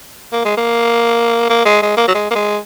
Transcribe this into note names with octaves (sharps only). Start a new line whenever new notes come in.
A#3
G#3
A#3
A#3
G#3
G#3
A#3
F#3
G#3
A#3
G#3